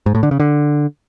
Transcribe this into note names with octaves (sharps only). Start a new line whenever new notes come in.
G#2
A2
D3
C#3
D3